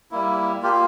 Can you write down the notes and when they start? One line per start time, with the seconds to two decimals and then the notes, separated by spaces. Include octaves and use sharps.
0.11 G3 A#3 E4
0.63 A#3 F4 G4